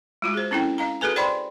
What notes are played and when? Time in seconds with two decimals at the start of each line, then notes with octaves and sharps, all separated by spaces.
0.22 G#3 F4 F#4
0.34 G#4 C5
0.51 C4 C#4 E4 A4 G5
0.78 D#5 F5 A#5
1.01 F#4 G#4 A4 B4 G#5
1.16 C5 D5 G5 B5 C6